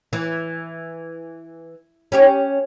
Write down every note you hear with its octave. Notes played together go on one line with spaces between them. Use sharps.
E3
C#4 G4 C#5